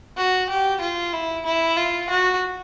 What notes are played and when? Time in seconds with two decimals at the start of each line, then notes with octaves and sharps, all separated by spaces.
0.17 F#4
0.49 G4
0.81 F4
1.13 E4
1.45 E4
1.77 F4
2.10 F#4